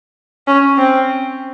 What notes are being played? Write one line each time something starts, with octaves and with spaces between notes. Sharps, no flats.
C#4
C4